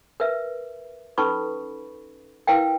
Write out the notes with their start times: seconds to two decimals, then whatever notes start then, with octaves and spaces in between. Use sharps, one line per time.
0.20 A#4 B4 E5
1.18 C#4 D#4 A4 B4 B5 C#6
2.47 E4 A#4 B4 F5 G5